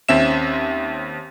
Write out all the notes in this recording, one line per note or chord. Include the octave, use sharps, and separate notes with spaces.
D#2 C4 C#4 E5 E7